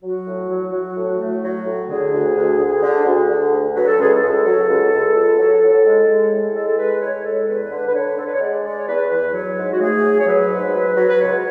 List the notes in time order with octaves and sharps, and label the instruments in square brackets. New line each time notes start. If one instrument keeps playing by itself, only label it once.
[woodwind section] F#3 F#4
A2
F#3
F#3
A2
A3
F#3
A2
D3 G#4
D2
D2
D2
D3
D2
D3
D2
F#3 B4
A4
C#2 G#4
A4
C#2
F#3
C#2
C#2
C#2
F#3
A2
G#3
G#3
A2
G#3 A4
A4
G#3 B4
A2 C#5
G#3 A4
E2 B4
D3
B4
D3 C#5
D3 A4
B4
C#5
G#3 D5
G#3 D5
C#5
E2 B4
E2 B4
F#3 C#5
G#2
F#4
A3 G#4
F#3
C#5
F#3 B4
G#2
F#3
F#3
B4
C#2 C#5